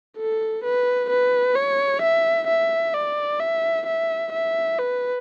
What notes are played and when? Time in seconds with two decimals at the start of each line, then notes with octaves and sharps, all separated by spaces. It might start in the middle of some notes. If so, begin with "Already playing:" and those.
0.17 A4
0.64 B4
1.10 B4
1.55 C#5
2.02 E5
2.47 E5
2.94 D5
3.40 E5
3.87 E5
4.33 E5
4.79 B4